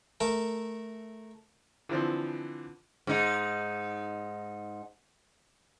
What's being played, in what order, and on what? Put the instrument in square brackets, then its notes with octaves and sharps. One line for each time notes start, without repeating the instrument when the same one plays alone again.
[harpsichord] A3 A#4 A5
[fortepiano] D3 E3 F3 C4
[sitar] G#2 D#4